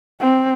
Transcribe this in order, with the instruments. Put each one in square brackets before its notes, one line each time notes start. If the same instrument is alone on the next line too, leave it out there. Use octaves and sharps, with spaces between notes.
[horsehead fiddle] C4